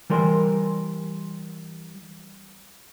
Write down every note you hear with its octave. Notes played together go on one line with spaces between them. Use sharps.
E3 G3 A#4 C6